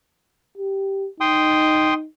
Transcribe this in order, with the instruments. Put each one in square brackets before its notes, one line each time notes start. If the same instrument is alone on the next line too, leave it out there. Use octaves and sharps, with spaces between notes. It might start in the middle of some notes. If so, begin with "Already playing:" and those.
[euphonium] G4
[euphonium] D#4 [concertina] G5 C6 D#6